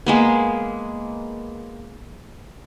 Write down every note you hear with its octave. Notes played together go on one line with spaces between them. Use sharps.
G#3 A#3 B3